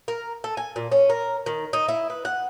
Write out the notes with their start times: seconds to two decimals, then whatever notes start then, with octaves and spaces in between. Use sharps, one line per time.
0.08 A#4
0.44 A4
0.57 G#5
0.76 A#2
0.92 C#4
1.10 A#4
1.46 D#3
1.73 D#4
1.88 E4
2.10 B4
2.25 F#5